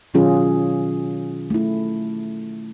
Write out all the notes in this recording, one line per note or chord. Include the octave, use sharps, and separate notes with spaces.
B2 D#3 F#3 C#4 F4 G#4
A3 E4